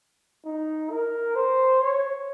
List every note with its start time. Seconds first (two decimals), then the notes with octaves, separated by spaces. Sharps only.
0.45 D#4
0.90 A#4
1.36 C5
1.81 C#5